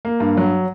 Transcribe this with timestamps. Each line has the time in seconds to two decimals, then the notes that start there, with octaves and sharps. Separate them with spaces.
0.05 A#3
0.20 G2
0.37 F#3